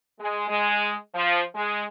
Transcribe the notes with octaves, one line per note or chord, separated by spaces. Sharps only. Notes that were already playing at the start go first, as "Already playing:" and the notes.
G#3
G#3
F3
G#3